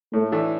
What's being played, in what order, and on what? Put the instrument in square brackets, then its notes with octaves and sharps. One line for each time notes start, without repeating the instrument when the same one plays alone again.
[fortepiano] A2 [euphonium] A3
[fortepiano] E3 A3 D4